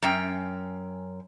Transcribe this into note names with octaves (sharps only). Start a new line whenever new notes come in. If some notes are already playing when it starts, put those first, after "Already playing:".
F#2 C#4 G5